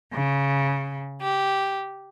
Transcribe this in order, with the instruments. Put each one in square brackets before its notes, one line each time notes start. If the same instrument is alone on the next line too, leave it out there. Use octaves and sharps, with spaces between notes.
[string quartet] C#3
G4